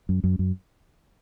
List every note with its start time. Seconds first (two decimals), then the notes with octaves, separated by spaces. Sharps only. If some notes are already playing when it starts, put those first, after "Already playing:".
0.09 F#2
0.24 F#2
0.39 F#2